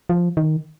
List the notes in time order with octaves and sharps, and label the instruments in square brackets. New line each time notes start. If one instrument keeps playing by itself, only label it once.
[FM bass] F3
D#3